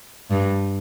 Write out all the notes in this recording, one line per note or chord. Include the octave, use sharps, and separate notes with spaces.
G2